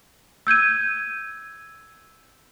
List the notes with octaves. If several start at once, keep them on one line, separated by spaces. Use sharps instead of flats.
E6 G6 G#6 D#7